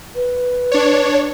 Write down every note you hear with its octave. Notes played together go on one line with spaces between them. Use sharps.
B4
D4 C#5